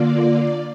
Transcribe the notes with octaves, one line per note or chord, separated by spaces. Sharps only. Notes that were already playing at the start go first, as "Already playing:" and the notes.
Already playing: D3 A#3 F4 D5